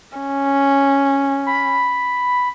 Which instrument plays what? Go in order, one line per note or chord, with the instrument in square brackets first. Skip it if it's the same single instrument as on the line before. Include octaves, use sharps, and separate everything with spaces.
[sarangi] C#4
[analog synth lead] B5